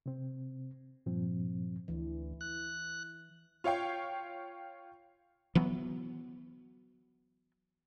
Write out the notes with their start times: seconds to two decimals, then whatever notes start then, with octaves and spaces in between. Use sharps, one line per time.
0.06 C3 C4
1.06 G2 A#2 F3 C4
1.88 D2 E3
2.41 F#6
3.64 F4 C#5 F5 G5
5.55 E3 F#3 B3